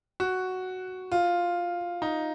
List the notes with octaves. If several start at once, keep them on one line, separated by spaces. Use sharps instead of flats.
F#4
F4
D#4